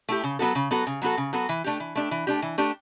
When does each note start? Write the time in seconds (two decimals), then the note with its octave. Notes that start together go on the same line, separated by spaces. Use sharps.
0.09 A3 E4 G4
0.24 C#3
0.39 F#3 B3 F#4 A4
0.55 C#3
0.71 F#3 B3 F#4 A4
0.87 C#3
1.02 F#3 B3 F#4 A4
1.17 C#3
1.33 F#3 B3 F#4 A4
1.49 E3
1.64 A3 D4 G4
1.80 E3
1.95 A3 D4 G4
2.11 E3
2.27 A3 D4 G4
2.42 E3
2.58 A3 D4 G4